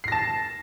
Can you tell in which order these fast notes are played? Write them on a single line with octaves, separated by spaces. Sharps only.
C7 A#6 A5